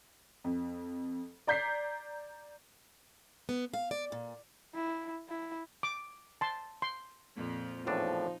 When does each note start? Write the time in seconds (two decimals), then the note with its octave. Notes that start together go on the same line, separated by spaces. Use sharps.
0.44 F2
1.47 D5 A#5 G6 G#6 B6 C7
3.49 B3
3.74 F5
3.91 D5
4.12 A#2
4.74 E4
5.29 E4
5.83 D6
6.41 A5 C6
6.82 C6
7.36 F2 A#2 F3
7.87 E2 A2 F3 D4 D#4